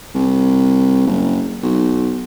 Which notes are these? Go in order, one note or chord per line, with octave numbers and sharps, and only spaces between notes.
C2
F#1
B1